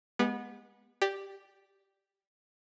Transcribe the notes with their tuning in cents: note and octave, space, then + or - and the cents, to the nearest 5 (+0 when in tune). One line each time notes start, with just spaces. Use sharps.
G#3 +0 B3 -20 G4 +30
G4 +0 D5 +0